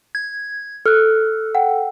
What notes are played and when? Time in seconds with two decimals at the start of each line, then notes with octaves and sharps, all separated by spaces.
0.15 G#6
0.86 A4 F6 F#6
1.55 F#5 G5